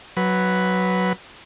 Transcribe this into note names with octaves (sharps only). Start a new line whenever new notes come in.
F#3 B4